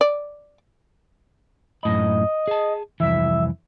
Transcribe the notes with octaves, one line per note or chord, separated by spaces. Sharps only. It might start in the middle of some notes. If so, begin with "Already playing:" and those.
D5
F#2 A2 D#5 B5
G#4 A5
C2 F2 E3 E5